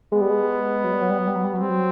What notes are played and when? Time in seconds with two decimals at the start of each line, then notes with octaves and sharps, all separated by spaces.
0.11 G#3 B3
0.21 G3
0.30 G#3
0.84 F#3
0.93 G3
1.01 F#3
1.10 G3
1.18 F#3
1.27 G3
1.35 F#3
1.44 G3
1.53 F#3 C4
1.62 G3
1.69 F#3